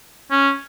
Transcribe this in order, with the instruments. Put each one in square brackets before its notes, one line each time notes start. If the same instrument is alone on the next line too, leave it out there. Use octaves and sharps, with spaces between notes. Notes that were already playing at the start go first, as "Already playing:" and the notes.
[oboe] C#4